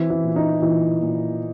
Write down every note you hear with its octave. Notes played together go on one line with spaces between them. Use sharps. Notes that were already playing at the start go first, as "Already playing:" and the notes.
Already playing: E3 C4 E4
E3 E4
A#2
D#4
A#2 E3 E4
A#2